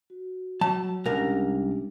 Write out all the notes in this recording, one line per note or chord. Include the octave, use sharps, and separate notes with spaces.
F#4
F#3 A5
C2 G#3 C#4 D4 A#4